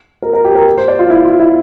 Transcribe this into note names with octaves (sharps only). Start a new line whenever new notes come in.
A#4
A#4
G4
A#4
C5
D5
F4
E4
F4
E4